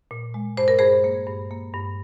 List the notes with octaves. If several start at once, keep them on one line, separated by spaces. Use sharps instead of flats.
A#2
G#3
G2 C5
A#4
G2 G#4 C5
A#3
G2
A#3
G2